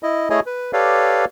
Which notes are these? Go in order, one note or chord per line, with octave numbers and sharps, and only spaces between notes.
E4 D#5
A3 E4 G#4 C#5 D#5 G#5
B4
G4 A4 B4 C#5 D5 F5